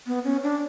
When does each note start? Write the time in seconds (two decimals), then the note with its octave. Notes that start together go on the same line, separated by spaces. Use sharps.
0.07 B3
0.24 C#4
0.43 D4